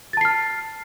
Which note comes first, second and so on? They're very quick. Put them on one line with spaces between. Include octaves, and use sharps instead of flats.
A6 A5 C7 F6